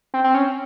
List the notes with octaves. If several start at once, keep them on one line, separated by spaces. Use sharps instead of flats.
C4
C4
C#4